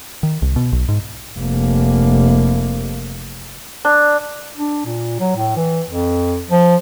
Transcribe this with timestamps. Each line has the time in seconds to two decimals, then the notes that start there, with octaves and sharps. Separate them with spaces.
0.23 D#3
0.42 C2
0.56 B2
0.72 B1
0.88 G#2
1.39 F1 A#3
3.85 D4
4.57 D4
4.86 A#2
5.20 F#3
5.36 A2
5.57 E3
5.90 F2
6.51 F3